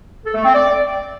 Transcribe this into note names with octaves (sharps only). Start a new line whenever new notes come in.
A4
A3
C4
D5